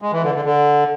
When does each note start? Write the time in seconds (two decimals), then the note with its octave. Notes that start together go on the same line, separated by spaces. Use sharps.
0.02 G#3
0.13 E3
0.24 D3
0.35 D3
0.45 D3